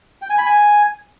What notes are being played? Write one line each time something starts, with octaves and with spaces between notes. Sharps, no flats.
G5
G#5
B5
G#5